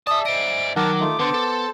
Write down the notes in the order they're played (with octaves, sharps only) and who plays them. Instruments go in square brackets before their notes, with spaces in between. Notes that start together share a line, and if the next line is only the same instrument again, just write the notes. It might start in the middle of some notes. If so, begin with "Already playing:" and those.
[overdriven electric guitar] G#4 A5 [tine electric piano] D5 E5 [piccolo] D#6
[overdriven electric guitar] C5 D#5 [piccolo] D7
[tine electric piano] D#3 [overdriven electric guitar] F#3 [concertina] A#4 F#5 A5 [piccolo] D6
[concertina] A3 D#4 F4
[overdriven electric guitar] D3 [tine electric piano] B3 [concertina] C5 A5
[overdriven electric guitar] A4